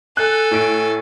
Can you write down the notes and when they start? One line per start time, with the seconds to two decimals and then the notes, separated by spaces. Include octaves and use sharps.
0.17 A4 G#5 F#6
0.51 A2 D7